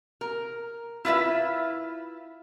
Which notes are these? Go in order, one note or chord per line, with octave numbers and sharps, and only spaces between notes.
A#4
E4 F4 B4 E5